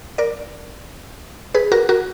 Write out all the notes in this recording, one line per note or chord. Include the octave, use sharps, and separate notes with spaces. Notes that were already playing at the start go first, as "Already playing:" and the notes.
A#4 D5
G#4 B4
F#4 A#4
F#4 A#4